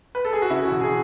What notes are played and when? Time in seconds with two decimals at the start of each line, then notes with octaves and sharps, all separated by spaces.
0.15 B4
0.25 A4
0.33 G#4
0.42 F#4
0.50 C#3 E4
0.65 F#4
0.71 E1
0.81 G#4